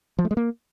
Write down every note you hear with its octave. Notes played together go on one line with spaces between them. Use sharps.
F3
A3
G#3
A#3